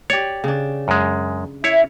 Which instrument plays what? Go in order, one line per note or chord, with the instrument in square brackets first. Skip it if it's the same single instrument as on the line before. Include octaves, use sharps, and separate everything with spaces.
[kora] G4 D5 [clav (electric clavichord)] C#5
[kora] C#3 D4
[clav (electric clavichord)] F#2 G#3
[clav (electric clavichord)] E4 C#5 [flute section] E5